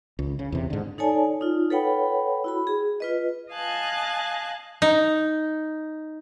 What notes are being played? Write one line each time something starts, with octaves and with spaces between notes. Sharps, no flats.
C#2
C#3
E2 C3
G#2 D3
D#4 A4 C#5 D5 G#5 A5
D#4 F4
A4 B4 C#5 F#5 G5 B5
E4 F#4 B5
G#4
F4 B4 D#5
D#5 F5 G#5 A5 F#6
D#4